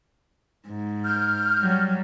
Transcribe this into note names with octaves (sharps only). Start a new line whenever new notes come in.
G#2
F6 G6
F#3 G3